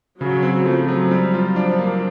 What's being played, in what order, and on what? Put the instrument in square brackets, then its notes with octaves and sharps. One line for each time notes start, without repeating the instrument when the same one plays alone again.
[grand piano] C#3 [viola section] F#3
[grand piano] C4
[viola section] F3 [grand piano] A3
[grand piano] F#3
[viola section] F3 [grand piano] G3
[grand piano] F4
[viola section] F3 [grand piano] D4
[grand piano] A#3